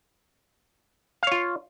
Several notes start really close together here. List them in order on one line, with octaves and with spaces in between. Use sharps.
F5 C#5 F4